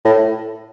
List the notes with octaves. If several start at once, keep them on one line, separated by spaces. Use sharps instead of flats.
A2